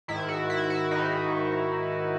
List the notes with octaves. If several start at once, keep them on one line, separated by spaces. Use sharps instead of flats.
G#2 D#3 E4
F#4
E4
F#4
G#2 D#3 D#4